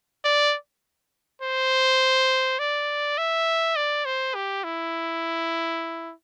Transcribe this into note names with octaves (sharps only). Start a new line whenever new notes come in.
D5
C5
D5
E5
D5
C5
G4
E4